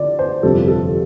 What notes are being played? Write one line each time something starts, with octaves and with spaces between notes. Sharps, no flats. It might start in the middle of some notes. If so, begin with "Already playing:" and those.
Already playing: D3 D5
C5
G1 F2 C3 G3 A4
A4